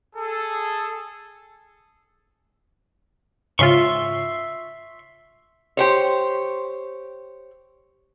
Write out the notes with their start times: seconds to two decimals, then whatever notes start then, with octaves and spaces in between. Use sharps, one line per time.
0.16 G#4 A4
3.59 G#2 C#3 F4 E5 C6 C#6
5.77 G4 C5 C#5